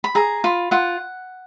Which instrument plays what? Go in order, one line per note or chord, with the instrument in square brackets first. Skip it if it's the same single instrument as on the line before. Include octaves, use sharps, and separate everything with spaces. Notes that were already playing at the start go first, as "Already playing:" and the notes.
[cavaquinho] B5
G#4 A#5
F4 B5
F4 F#5